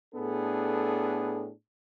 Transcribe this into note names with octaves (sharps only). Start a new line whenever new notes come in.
A2 B3 D4 G#4 A4